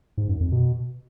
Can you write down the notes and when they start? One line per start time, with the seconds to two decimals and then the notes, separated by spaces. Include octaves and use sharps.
0.18 G#2
0.29 F#2
0.41 F2
0.52 B2